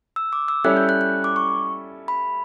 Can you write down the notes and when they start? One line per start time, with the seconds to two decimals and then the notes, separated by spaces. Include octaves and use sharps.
0.16 E6
0.33 D6
0.48 E6
0.64 G3 C#4 E4 A4 C#5 F#6
0.77 G6
0.89 F#6
1.01 F#6
1.24 D6
1.36 C#6
2.08 B5